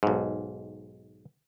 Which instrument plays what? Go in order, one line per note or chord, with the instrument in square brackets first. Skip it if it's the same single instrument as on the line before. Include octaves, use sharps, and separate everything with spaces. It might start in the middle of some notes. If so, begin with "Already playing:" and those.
[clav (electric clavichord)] B1 G#2